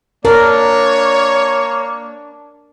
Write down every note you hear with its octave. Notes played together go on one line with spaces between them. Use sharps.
A#3 D4 A#4 C#5